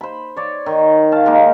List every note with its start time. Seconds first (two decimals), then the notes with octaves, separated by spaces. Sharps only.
0.01 C5 B5
0.36 C#5 D5
0.66 D#3
1.12 F5 A5
1.26 G#3 A#3 D#4